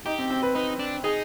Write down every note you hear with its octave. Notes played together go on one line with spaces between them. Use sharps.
D#4 G4
C4
C4
B4
D#4 B4
D4
D#4 G#4